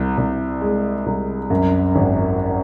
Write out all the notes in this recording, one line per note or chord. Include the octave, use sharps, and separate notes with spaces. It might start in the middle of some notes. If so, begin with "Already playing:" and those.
Already playing: C2
C2
G#3
C2
F#2
G#1